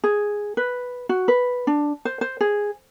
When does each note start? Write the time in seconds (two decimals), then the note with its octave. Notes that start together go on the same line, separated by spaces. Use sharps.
0.04 G#4
0.57 B4
1.09 F#4
1.28 B4
1.67 D4
2.05 C5
2.21 C5
2.41 G#4